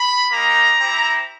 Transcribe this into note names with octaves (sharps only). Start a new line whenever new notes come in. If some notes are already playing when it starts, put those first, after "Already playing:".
Already playing: B5
A#3 D#4 G4 A#5
C4 E4 G4